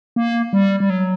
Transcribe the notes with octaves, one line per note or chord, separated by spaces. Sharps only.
A#3
G3
G3
F#3